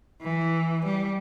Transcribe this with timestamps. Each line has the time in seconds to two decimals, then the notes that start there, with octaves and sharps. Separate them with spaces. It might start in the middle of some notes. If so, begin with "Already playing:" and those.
0.22 E3
0.85 G3